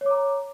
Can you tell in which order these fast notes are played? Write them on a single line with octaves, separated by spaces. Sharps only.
C#5 D6 A#5